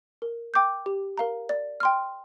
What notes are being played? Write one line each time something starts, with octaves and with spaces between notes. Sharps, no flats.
A#4
G5 D6 G6
G4
A#4 F5 A#5
D5
G5 C6 F6